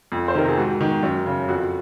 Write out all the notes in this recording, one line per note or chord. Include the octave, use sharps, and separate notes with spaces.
F2
C5
C3 D#3 A#4
G#4
G#2 F#4
D#3
F#2
C#3
F2 F#4